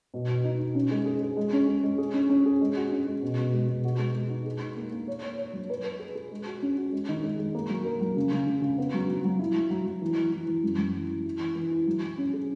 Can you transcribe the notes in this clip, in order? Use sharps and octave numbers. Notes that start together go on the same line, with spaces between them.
B2
B2
D#4
D#4
C#4
G#3
G#4
G#4
G#3
C#4
G#3
G#3
G#4
C#4
C#4
G#4
G#3
F#4
C#4
G#3
B2
B2
G#3
B2
F#4
G#3
G#3
D#4
G#4
D#4
A#3
A#3
C#5
C#5
C#5
F#3
B4
B4
G#4
G#4
G#3
F#4
C#4
F#4
G#3
D#3
G#3
G#3
A#3
F#3
A#4
F#3
C#3
C#3
C#3
C#3
B3
F#3
F#3
F#3
E4
F#3
F#3
F#3
E3
E3
E3
E3
F#2
F#2
E3
E3
E4
E3
E3
E4
F#3
F#3
C#4
G#4